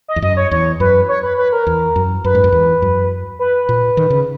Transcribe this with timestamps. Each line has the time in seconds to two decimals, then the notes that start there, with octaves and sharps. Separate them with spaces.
0.08 D#5
0.16 E2
0.22 F#2 D#5
0.37 C#5
0.51 E2 C#5
0.80 F#2 B4
1.09 C#5
1.23 B4
1.38 B4
1.52 A#4
1.67 E2
1.96 F#2
2.24 F#2 B4
2.35 G#2
2.44 F#2
2.52 E2
2.82 F#2
3.39 B4
3.69 A#2
3.97 D#3
4.10 C#3